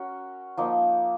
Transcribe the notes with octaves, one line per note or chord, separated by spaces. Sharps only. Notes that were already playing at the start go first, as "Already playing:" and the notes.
Already playing: C#4 F#4 A#4
F3 A#3 D#4